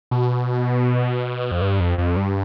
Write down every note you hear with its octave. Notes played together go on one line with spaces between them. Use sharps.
B2
F2
G2
F2
F2
G2